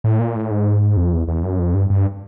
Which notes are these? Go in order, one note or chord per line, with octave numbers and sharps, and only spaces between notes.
A2
A#2
A2
G#2
F2
E2
E2
F#2
F2
G2
G2